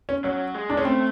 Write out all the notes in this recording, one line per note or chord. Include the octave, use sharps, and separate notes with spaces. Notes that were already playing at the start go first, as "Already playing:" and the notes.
C#4
F#3 C#4
G#3
D4
G#3 C#4
A3 C4